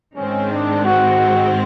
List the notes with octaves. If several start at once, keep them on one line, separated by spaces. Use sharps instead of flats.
G#2 D#3 G#3 C4 C#4
D4
F#4